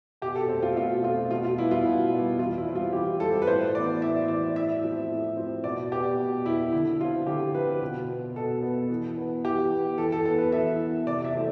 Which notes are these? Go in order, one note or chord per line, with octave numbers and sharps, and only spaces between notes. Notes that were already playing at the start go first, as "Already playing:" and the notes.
B2 G4
A4
A3 C4
F4
B2 F4
A3 C4 F4
B2 F4
F4
G3 B3 E4
F4
B2
G3 B3
E3 F4
E4
G3 C4
F4
E3 G4
G3 C4 A4
B4
A2 C5
E3 B3 D5
A2 E5
E3 B3 D5
A2 E5
F3 C4
A2
F3 C4
B2 D5
B3 G4
B2
B3 E4
D3 E4
F3 C4 F4
D3 G4
F3 C4 B4
B2
B3
B2 A4
B3
E3
B3
E3 G4
B3
E3 A4
A4
B3 A4
B4
E3 E5
B3
C3 D5
E5
E3 A3 C4